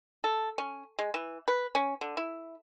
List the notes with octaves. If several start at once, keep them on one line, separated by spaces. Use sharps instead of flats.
A4
C#4
G#3
E3
B4
C#4
D3
E4